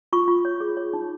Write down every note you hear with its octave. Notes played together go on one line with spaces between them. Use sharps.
F4 C#6
F4
C#5
G#4
C#5
D#4